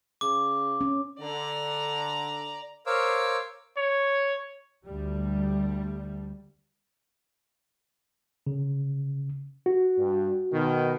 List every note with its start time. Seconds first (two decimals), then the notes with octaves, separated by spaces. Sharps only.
0.21 C#3 D6
0.81 C#4
1.19 D3 D5 A#5
2.86 A#4 C5 C#5 F5 D6 E6
3.77 C#5
4.85 D2 G3
8.47 C#3
9.66 F#4
9.98 G2
10.52 B2 D#3